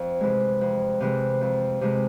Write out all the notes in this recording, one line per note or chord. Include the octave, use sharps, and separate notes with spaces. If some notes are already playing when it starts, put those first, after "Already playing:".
Already playing: F2
C3 E3 G#3
F2
C3 E3 G#3
F2
C3 E3 G#3